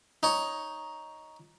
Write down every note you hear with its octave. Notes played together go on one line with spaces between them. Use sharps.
D#4 C#5